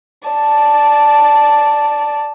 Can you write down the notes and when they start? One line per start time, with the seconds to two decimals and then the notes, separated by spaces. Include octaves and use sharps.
0.28 D5 A5